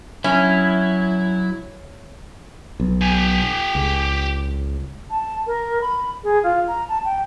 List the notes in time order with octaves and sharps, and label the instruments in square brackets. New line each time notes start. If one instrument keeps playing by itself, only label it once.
[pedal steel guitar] F#3 E4 [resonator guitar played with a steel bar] C#4
[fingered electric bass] B1
[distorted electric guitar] G4 G#5
[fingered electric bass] C#2
[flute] A5
A#4
B5
G#4
F4
A#5
A5
G5